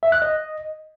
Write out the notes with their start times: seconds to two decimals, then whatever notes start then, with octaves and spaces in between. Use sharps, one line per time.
0.03 E5
0.12 F#6
0.22 D#5